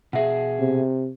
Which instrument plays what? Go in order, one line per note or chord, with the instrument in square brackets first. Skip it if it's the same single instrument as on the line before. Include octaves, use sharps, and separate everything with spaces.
[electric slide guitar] B2 G#4 [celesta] E5 F#5
[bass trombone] C3